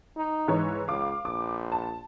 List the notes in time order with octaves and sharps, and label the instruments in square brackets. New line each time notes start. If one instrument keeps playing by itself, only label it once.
[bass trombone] D#4
[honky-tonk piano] G#2 E3 C#5
[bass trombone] C#2 [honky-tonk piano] F5 D6
[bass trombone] A#1 [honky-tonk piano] D6
[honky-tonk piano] A5